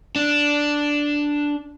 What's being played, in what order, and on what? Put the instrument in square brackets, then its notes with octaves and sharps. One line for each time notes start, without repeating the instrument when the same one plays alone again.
[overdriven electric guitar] D4